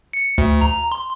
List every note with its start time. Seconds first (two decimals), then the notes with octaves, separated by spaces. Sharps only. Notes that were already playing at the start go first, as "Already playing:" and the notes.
0.13 C#7
0.38 D2
0.61 A#5
0.92 C6